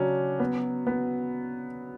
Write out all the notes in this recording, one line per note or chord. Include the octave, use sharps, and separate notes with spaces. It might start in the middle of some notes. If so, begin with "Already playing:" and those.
Already playing: C#3 F#3 C#4 D4
B3
B3